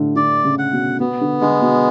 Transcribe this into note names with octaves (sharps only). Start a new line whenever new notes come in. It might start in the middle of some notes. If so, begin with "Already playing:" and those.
Already playing: A2 D3
D3 D5
C#3
F#5
B2
B2 B3
D3
D3 G#3
B2